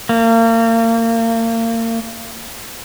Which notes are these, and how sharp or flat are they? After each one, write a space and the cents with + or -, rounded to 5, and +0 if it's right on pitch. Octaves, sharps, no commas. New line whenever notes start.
A#3 -35